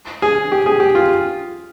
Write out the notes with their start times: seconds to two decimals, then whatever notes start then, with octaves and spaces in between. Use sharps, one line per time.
0.22 G#4
0.52 G4
0.66 G#4
0.80 G4
0.95 F4